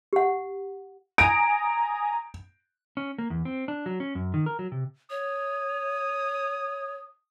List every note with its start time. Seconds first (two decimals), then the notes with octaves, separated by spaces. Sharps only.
0.13 G4 F#5
1.18 G#5 A#5 D#6 D7
2.97 C#4
3.18 A#3
3.30 E2
3.45 C4
3.68 D4
3.86 F#3
4.00 C#4
4.15 F#2
4.34 D#3
4.46 A#4
4.59 F#3
4.72 C3
5.10 C#5 D#6